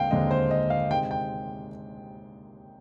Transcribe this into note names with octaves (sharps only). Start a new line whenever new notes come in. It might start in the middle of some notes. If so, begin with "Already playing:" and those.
Already playing: D#2 D3 G#3 C4 F5 G5
D#2 D3 G#3 C4 D#5
C5
D#5
F5
C3 D#3 G#3 C4 G5
G5